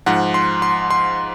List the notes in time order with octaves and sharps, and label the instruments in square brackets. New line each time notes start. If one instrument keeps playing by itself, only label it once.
[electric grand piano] G#2 F3 F#5
C6
C6
C6